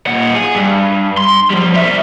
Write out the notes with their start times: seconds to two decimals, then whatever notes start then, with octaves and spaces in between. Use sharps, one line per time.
0.07 A#2 F#5
0.35 G#4
0.56 G2
1.18 C6
1.51 F3 G3
1.74 G3 E5